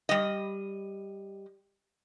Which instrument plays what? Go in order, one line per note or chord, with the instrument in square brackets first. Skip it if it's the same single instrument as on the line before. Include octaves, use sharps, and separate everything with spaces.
[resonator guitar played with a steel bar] G3 D#5